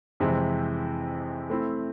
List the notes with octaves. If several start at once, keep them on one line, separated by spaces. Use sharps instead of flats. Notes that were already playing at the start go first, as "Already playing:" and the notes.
F2 C3 E3 G#3 C4
A3 C4 E4